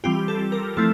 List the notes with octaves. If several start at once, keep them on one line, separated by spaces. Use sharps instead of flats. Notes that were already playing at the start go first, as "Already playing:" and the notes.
E3 G3 C4 F4 G4
A4
A#4
F3 A3 C4 E4 A4